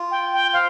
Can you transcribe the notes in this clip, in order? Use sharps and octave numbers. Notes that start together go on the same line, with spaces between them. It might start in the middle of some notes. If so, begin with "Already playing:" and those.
Already playing: F4
G5
G5
C5 F5